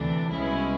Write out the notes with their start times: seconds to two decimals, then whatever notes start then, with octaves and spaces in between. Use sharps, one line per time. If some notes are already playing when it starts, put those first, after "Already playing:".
Already playing: D2 C3 E3 A3 D4
0.31 C2 B2 G#3 C#4 E4